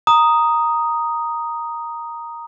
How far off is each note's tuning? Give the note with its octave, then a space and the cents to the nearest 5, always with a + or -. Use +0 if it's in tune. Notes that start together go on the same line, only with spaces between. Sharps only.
A#5 +0 D#6 +0